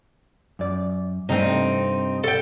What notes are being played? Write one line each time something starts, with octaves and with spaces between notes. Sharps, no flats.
F#2 D5
G2 C3 A3 C4 D#4
A4 G5